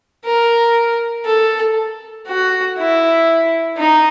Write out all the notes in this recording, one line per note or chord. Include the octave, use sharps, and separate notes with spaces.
A#4
A4
F#4
E4
D#4